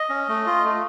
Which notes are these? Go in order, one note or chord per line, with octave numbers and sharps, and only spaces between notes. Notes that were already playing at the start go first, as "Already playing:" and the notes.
Already playing: D#5
C#4
A3
F4
A3